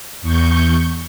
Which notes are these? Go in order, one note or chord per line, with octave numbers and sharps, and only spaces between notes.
E2 C#6 G6